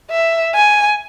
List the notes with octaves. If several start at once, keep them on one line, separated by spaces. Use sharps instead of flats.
E5
G#5